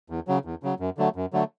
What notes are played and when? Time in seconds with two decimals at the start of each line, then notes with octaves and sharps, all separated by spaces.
0.10 E2
0.27 C#3 F#3
0.45 E2
0.63 C#3 F#3
0.80 F#2
0.98 D3 F#3 A3
1.16 F#2
1.33 D3 F#3 A3